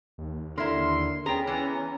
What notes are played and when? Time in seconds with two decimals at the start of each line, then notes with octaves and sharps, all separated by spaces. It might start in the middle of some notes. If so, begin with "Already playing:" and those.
0.18 D#2
0.58 D3 E4 A#4 E5 A#5 C6
1.26 B3 C#4 G#4 G5 A#5
1.47 E3 B3 A#5